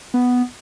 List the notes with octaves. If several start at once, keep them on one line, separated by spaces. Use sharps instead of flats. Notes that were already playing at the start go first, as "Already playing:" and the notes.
B3